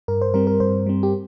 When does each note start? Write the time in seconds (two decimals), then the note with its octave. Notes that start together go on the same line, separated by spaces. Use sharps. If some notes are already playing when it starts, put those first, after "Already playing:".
0.08 G2 A#4
0.21 C5
0.34 G3 C4 A#4
0.47 A#4
0.60 G2 C5
0.86 G3 C4
1.03 G4